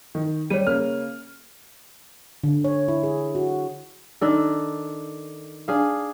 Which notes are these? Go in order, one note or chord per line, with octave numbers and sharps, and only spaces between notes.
D#3
G3 C#5 D#7
C#3 A#3 F6
D3
C#5
E4
G#4
F#4
D#3 D4 A4
D4 G#4 F5